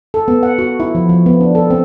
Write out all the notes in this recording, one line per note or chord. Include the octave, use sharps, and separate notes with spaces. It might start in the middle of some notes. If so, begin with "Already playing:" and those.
A4
B3
F#5
F#4
E4
F3
F3
B3
D4
A4
C4